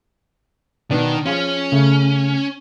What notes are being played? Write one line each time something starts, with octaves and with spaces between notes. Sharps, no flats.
B2 D#3 B3 D4
F3 C#4 F4 G#4
C#3 A3